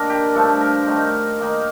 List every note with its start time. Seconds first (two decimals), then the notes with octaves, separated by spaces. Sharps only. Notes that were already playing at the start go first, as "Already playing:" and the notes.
Already playing: D#3 A#3 D4 A#4
0.10 G4
0.35 G2 F3 A3 A4
0.61 A#4
0.87 D#3 A3 D#4
1.39 D#3 A#3 D#4